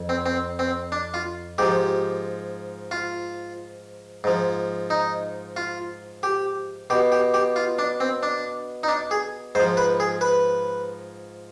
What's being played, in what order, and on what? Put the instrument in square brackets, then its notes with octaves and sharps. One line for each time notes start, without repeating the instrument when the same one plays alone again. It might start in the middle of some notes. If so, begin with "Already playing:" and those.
Already playing: [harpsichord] F2
C4
C4
C4
D4
F4
G#2 F3 G4
F4
G#2 F3
D#4
F4
G4
B2 G4
G4
G4
F4
D4
C4
D4
D#4
D4
G#4
G#2 C5
F3
B4
G#4
B4